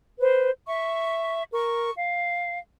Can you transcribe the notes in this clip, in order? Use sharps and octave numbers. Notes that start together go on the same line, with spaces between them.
B4 C5
E5 C#6
A#4 C#6
F5